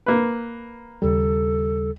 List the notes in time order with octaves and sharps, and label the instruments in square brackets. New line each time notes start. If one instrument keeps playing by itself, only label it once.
[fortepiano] A#3 B4
[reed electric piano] D#2 C#3 G3 [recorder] A4